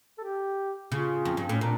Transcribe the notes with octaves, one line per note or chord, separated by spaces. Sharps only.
A4
G4
C#3 F4
F2
G2
A2 C#4
A#2 D4